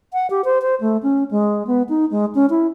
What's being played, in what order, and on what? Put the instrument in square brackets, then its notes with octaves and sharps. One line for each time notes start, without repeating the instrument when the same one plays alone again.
[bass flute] F#5
G4
C5
C5
A3
C#4
G#3
B3
D#4
G#3
C#4
E4